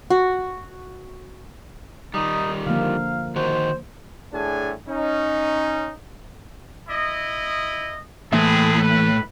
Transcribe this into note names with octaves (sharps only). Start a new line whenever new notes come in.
F#4
D#3 G3 D#4
D3 F3 A#3 F5
D#3 F#4 C5
A2 D4 G#4 G#5
C#4 D#4
E4 D#5
A2 E3 A#3 C4 G#4 B4 E5
B4